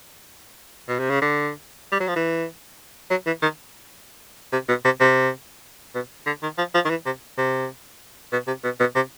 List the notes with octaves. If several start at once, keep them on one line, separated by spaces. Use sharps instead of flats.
B2
C3
C#3
D3
G3
F#3
F3
E3
F#3
E3
D#3
C3
B2
C3
C3
B2
D3
D#3
F3
F3
D#3
E3
C3
C3
B2
C3
B2
B2
C3